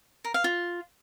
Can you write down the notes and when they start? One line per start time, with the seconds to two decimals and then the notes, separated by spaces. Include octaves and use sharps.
0.25 A#4
0.34 F5
0.44 F4